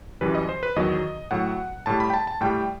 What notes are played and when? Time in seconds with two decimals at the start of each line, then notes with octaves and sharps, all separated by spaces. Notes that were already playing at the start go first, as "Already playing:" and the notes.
0.21 F#2 E3 G3 B4
0.35 D#5
0.49 C5
0.63 B4
0.76 E2 D#3 F#3 D#5
1.31 A2 F#3 F#5
1.86 A2 G3 A5
2.00 B5
2.10 G5
2.14 A5
2.27 A5
2.41 A2 G3 G5